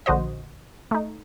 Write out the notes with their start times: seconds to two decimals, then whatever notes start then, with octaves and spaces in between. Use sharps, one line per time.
0.06 A#1 D3 F#4 C5 D#5
0.91 A3 D#4